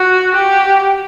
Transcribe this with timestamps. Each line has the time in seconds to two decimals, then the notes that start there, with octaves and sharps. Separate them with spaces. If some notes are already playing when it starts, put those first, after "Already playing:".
Already playing: F#4
0.35 G4